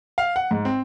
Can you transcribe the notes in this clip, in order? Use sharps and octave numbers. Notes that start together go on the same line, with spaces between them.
F5
F#5
G#2
C4